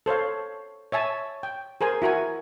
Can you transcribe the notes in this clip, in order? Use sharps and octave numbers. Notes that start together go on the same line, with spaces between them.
A4 C5 C#5 F5
C#5 E5 G#5 A5
G5
G#4 A#4 C5 G#5
E4 F#4 A#4 G#5